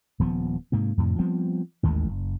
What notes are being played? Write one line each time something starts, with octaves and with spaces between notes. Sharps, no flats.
D#1 F3 B3
G#2 C3 A#3
F2 A2 C3
F3 G3 B3 C4
A1 D#2 D#3 G#3
F#1